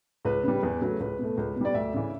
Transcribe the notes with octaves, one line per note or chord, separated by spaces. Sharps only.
C#2 B4
C#3 G3
E2
C#3 F#3 A3
C#2 B4
B2 A3
C#2
B2
G3 D5
D2 E5
C#3 E3